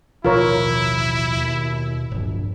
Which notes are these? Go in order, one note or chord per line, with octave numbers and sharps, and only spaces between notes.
A1 D#2 B2 F3 E4 F4 A#4 C#5
D#2
D1 A#1 G2